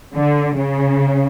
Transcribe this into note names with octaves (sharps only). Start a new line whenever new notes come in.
D3
C#3